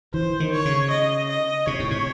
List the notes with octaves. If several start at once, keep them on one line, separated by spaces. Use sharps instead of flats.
E3 C5
D#3
C#5
C#3
D#5
D#5
C3 C#5
A2
C3